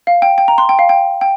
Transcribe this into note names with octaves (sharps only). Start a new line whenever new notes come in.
F5
G5
G5
A#5
C6
G5
F5
G5
G5